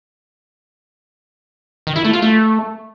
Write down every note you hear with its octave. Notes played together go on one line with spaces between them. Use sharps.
D#3
E4
A3
F4
A3